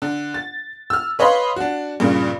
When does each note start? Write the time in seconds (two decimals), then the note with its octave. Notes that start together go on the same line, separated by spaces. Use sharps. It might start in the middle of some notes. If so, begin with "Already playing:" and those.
0.02 D3
0.34 A6
0.90 E6 F6
1.19 B4 C#5 D#5 F5 B5 C6
1.56 D4 F#4
2.00 G2 A#2 C#3 A#3